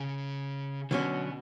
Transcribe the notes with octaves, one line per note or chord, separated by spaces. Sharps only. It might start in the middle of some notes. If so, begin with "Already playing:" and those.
Already playing: C#3 C#4
B2 D3 F#3 B3 C#4